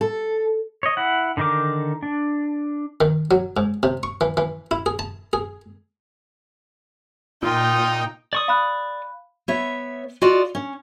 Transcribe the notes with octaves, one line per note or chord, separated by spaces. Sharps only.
A4
C#5 D#5
E4 F#5
D3 D#3 D#4 A#4 D6
D4
D#3
F#3
G#2
C3
C#6
E3
E3
E4
G#4
A5
G#4
A#2 D#4 F4 G5
D5 C#6 D#6
F5 B5 F#6
B3 C#5 E5
F4 F#4 D5 D#5
C#4